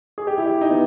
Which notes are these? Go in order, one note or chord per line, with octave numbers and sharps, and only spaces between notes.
G#4
G4
E4
G4
D#4
B3